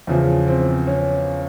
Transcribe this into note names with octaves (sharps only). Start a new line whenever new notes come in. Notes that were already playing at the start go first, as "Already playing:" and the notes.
E2 C#3 F3
C4
C#4